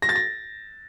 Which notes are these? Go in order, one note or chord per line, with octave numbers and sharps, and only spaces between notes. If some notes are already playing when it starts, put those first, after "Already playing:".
A#6
A6
A#6